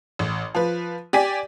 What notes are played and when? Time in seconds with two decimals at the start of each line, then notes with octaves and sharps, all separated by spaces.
0.19 A1
0.55 F3 B4
1.13 G4 D5 G#5 B6